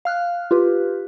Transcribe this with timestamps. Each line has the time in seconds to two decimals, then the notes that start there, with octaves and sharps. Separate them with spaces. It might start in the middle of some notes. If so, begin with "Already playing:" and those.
0.05 F5 F6 F#6
0.51 F4 G4 B4